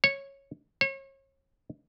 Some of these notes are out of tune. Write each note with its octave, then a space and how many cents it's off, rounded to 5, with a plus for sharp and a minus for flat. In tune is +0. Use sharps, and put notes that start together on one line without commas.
C#5 -10
C#5 -35